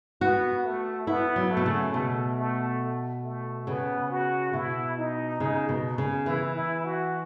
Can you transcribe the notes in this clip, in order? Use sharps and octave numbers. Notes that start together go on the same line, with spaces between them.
B3 F#4
A3
B3 E4
F#3
A3
B2
C#3
B2 A3
A3
A3
C#3 B3
F#4
B2 E4
D#4
C#3 D#4
B2
C#3
E3 E4
E4
F#4